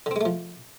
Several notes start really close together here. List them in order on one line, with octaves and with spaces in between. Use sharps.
D3 C4 G#3 A3 F3